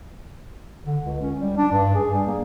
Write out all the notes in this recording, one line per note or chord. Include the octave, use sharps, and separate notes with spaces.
D3
C#2
C#4
G3
D4
G2
G#4
G3
A#3